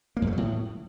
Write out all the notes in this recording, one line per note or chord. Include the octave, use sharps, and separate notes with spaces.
A#3
F2
A3
F#3
A2